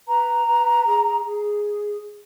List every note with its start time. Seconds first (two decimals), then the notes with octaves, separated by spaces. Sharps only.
0.08 B4 A#5
0.46 B4
0.86 G#4
1.24 G#4